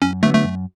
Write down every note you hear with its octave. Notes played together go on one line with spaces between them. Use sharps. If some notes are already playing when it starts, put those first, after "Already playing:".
F#2 C#4
D3 F#3 A3 B3
A3
F#2